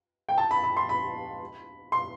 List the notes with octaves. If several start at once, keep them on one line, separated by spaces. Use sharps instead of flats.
G5
A5
B5
B5
C6
B5
C6